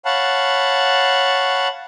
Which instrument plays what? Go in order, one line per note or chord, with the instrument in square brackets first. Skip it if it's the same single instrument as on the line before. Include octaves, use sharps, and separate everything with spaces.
[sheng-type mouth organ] C#5 F5 F#5 A5 B5